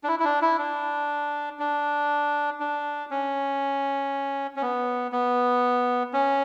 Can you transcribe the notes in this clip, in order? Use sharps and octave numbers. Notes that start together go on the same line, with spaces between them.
D4
E4
E4
D4
E4
D4
D4
D4
C#4
C#4
B3
B3
C#4